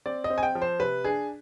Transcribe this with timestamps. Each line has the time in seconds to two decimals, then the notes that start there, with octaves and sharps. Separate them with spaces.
0.06 C4 D5
0.24 D#5
0.30 C4
0.38 G#5
0.43 G5
0.55 F3
0.62 C5
0.80 C3 B4
1.04 D4 G#4